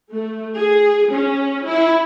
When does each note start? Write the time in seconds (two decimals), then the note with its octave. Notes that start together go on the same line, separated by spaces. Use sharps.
0.14 A3
0.57 G#4
1.14 C#4
1.67 E4